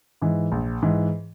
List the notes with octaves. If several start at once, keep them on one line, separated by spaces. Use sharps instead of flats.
G#2 E3
A#1
G#2 E3